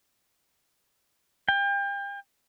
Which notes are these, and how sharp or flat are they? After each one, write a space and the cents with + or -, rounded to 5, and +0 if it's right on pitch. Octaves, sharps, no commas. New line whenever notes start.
G5 +35